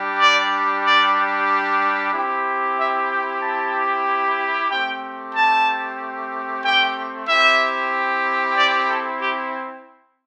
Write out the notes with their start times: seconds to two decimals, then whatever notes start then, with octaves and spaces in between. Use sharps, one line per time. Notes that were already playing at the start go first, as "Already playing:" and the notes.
Already playing: G3 D4 G4
0.20 D5
0.85 D5
2.13 C4 E4 G4
2.77 E5
3.10 G5
3.42 A5
4.70 A3 C4 G4 G5
5.35 A5
6.64 G5
7.28 C4 E4 G4 E5
8.58 D5
8.90 A4
9.21 G4